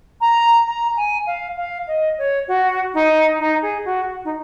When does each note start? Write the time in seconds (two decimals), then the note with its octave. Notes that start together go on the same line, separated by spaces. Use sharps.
0.21 A#5
0.66 A#5
0.96 G#5
1.26 F5
1.57 F5
1.87 D#5
2.18 C#5
2.48 F#4
2.94 D#4
3.39 D#4
3.62 G#4
3.85 F#4
4.24 D#4